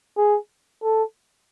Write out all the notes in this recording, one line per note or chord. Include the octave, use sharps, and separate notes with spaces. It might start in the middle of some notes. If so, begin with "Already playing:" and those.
G#4
A4